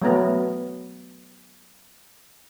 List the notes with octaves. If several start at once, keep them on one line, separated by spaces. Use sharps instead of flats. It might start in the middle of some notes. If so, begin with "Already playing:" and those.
F#3 A3 B3